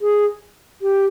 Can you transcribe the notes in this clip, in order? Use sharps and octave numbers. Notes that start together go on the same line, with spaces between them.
G#4
G4